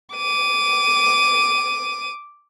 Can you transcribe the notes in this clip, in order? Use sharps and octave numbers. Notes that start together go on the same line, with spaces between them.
D6 D#7